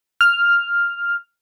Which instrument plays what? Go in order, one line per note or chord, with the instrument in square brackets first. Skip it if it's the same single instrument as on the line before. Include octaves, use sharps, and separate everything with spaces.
[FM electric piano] F6